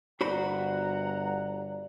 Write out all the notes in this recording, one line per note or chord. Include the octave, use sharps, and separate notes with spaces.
G1 F#4 C5 D5 F#5 A#5 B5